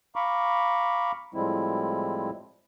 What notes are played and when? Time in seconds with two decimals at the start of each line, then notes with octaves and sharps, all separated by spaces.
0.16 F5 A#5 B5 C#6 D6
1.34 A2 F3 G3 G#3 C4 E4